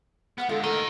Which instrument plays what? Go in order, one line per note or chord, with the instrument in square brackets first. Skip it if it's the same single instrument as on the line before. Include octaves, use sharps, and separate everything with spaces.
[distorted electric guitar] B3 [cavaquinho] B4 F5 F#5
[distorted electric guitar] D3 G#3 [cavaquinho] F4 [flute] A4
[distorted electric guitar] D2 A#4 [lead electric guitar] D#3 [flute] A4 [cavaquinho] D#5